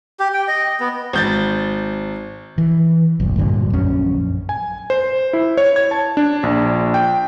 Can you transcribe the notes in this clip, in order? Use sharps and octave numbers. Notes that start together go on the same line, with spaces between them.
G4
G5
D#5
B3
G#1 G6 A6
E3
F#1 B1
G2 A#2 D3 F#3
A#1 F#2 C#4
G#5
C5
E4
C#5
G#6
A5
D4
A#1
G5